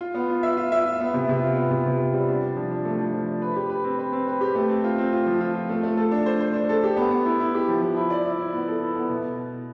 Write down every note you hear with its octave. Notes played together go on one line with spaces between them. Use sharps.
F4
B3
F4
E5
F4
E5
F4
B3
C3
C3
F4
B3
C3
C3
F4
G3
D4
D4
F3
D4
A3
F3
F3
D4
B4
G4
B4
C4
B4
C4
B4
G4
A3
C4
F4
C4
F4
F3
F4
F4
A3
A3
A4
D4
C5
C5
D4
A4
G4
B3
B3
E4
E4
G4
F3
F3
E4
D5
E4
E4
B3
A4
E4
B3
B2